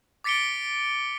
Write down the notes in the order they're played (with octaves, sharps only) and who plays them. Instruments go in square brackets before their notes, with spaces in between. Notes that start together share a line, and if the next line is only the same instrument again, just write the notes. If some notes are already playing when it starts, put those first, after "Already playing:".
[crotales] D6 A6 B6 C#7 D7 G7